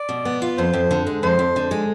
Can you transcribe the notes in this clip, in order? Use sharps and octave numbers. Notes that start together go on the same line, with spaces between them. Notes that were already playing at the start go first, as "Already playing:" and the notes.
Already playing: D5
B2
B3
F4
F2 C5
F2
D3
G#3
F2 C5
F2
D3
G#3